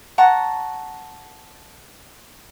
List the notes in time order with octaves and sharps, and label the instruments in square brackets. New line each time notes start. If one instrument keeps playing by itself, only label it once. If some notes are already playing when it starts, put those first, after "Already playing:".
[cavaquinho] F#5 A5 A#5 C#6